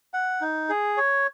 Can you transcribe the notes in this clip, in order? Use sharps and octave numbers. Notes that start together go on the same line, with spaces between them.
F#5
D#4
G#4
C#5